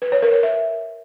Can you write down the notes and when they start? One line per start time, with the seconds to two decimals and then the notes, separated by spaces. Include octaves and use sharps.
0.02 B4
0.12 C#5
0.22 A#4
0.33 C#5
0.43 E5